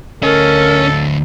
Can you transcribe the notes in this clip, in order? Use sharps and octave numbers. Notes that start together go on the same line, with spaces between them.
D2 C#4 A4 A#4 D#5